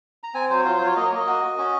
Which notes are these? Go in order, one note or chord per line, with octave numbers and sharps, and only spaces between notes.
A#5
C4 G#5
F#3 C5
C#5
F4 C5
C5
F#3
C#5
A#3 D#5
C#5
A#3 D#5
F#4
F#4
C#4